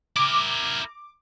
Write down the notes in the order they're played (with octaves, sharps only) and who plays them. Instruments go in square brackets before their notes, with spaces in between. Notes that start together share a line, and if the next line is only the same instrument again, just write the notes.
[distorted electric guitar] E4 A#4 [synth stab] D6